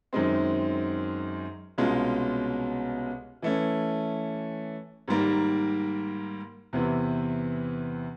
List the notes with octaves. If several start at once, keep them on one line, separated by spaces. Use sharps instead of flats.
F#2 D#3 G#3 C4
C2 B2 G#3 C#4 F4
E3 A3 C#4
G#2 D#3 G3 A#3
E2 C3 E3